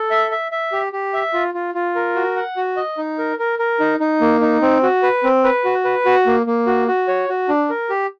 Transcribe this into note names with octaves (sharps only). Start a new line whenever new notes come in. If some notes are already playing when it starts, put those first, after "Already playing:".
Already playing: A4
E5
E5
E5
G4
G4
E5
F4
F4
F4
A#4
F#4
F#5
F#4
D#5
D#4
A#4
A#4
A#4
D#4
D#4
A#3
D#4
C4
F#4
B4
C4
B4
F#4
B4
F#4
A#3
A#3
F#4
F#4
C#5
F#4
D4
A#4
G4